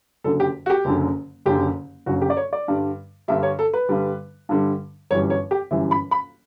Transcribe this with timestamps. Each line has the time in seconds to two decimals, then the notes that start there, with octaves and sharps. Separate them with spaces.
0.24 F#1 F#2 D3 A4
0.40 G4
0.66 F#4
0.70 G4
0.85 F#1 F#2 D3
1.46 F#1 F#2 D3 G4
2.06 F#1 F#2 D3 F#4
2.22 G4
2.30 D5
2.37 C#5
2.53 D5
2.68 G2 D3 G3
3.28 G2 D3 G3 E5
3.43 C#5
3.59 A4
3.74 B4
3.89 G2 D3 G3
4.49 G2 D3 G3
5.11 G1 F#2 E3 G3 C#5
5.30 C#5
5.51 G4
5.71 G1 F#2 E3 G3 E5
5.91 B5
6.11 B5